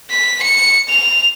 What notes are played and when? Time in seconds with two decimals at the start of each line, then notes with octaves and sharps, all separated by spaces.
0.10 B6
0.42 C#7
0.89 F7